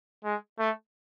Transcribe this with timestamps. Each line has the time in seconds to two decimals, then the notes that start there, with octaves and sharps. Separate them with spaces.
0.24 G#3
0.59 A3